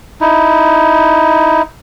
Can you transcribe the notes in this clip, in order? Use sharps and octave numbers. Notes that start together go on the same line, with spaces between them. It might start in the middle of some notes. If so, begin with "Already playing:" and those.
D#4 E4